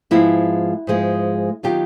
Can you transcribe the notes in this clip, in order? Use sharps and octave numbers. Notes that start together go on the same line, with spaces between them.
G#2 F3 G#3 B3 E4 F#4
G#2 F3 G#3 B3
D#3 F#3 B3 F4 G4